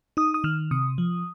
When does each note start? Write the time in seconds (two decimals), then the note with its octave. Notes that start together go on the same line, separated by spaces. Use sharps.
0.17 D#4 D#6
0.34 D#6
0.44 D#3 F6
0.71 C3 D#6
0.98 F3